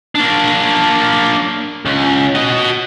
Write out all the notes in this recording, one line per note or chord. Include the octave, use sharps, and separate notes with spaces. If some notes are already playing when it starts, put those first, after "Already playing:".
A#3 D4
C#2
F#4 D#5